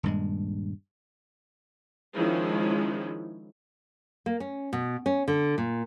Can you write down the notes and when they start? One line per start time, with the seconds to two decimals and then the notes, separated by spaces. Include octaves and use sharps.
0.03 D#1 G2 G#3
2.14 D#3 F3 G#3 C#4 E4
4.26 A#3
4.40 C#4
4.73 B2
5.06 C#4
5.28 D3
5.58 A#2